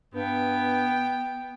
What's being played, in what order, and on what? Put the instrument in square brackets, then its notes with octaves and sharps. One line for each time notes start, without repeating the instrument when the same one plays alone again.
[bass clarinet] G2 [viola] B3 G5